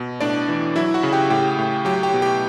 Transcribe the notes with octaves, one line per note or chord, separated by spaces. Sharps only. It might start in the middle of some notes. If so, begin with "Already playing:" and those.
Already playing: B2
A2 D4 D5
E3
F#3 E4 E5
F#4 F#5
C#3
G4 G5
A2 G4 G5
A2
F#3 G4 G5
G4 G5
B2
G4 G5